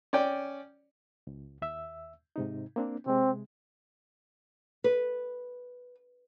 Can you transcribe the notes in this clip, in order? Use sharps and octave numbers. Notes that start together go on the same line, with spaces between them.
C#4 D5 G5
C#2
D#2 E5 E6
G#2 C3 D#4
A#3 C4 D4
C3 G#3 C4
B4